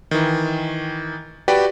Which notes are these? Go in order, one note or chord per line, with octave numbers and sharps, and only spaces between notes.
D#3 E3
F#4 G4 B4 D5 G5